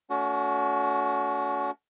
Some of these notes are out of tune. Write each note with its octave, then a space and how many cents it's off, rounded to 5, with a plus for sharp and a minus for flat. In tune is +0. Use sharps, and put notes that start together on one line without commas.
A3 +0 C#4 +45 F#4 +0